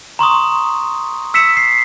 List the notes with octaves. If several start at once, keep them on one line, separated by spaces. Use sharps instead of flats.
A#5 C6 C#6 D#6
E6 B6 C#7 E7
C7